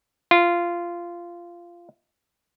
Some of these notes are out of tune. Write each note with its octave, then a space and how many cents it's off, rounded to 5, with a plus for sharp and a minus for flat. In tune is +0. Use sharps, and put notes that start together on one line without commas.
F4 -15